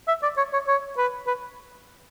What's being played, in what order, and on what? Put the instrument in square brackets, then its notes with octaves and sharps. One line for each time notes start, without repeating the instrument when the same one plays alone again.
[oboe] E5
D5
C#5
C#5
C#5
B4
B4